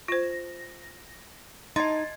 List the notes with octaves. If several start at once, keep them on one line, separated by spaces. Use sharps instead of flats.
F4 C5 A#6
D#4 D#5 C6 G#6 A6